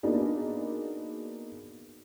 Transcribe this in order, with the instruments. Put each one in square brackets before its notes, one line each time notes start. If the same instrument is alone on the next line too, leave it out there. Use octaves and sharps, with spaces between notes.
[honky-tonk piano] A#3 B3 D4 D#4 F#4 G#4